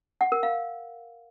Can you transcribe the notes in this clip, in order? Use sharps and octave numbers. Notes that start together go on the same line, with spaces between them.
F#5
A#4
F5